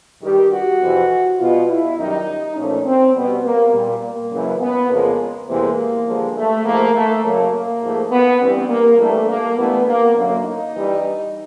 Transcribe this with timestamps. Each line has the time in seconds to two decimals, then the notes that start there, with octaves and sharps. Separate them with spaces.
0.23 G2 D#3 G3 G4
0.53 F#4
0.81 F2 C3 E3
1.39 B2 G3 F4
1.69 E4
1.98 F#2 D#3 G3 D#4
2.56 A#2 F3 A3 C#4
2.86 C4
3.15 B2 G3 B3
3.45 A#3
3.74 A#2 G3
4.03 A#3
4.32 F#2 C#3 E3 G#3
4.61 B3
4.90 F2 C#3 F3 G#3 A#3
5.49 E2 C3 E3 G#3 A#3
6.07 G2 D3 F3 G#3
6.36 A3
6.65 G#2 F3 A3 A#3
6.95 A3
7.24 F#2 C#3 F#3 A#3
7.53 A#3
7.82 G#2 F3 A3
8.11 B3
8.41 G2 E3 G3 C4
8.70 A#3
8.99 G2 E3 G3 A3
9.28 A#3
9.57 G2 E3 A3 B3
9.87 A#3
10.15 F#2 D3 F#3 A#3
10.45 D#4
10.74 G2 E3 G3